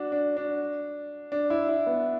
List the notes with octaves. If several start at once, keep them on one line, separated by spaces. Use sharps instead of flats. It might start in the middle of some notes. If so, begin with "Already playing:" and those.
Already playing: D4 F#4
D4
D4
D4
E4
E4
B3